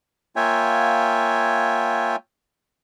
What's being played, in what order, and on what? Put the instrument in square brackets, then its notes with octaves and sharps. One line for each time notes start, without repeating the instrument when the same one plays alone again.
[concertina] A#3 F4 C#5 E5 G5 G#5